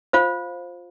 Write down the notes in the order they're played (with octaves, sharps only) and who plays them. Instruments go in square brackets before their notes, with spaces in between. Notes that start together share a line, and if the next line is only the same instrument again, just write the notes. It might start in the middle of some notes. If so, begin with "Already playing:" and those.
[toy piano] F4 C5 F5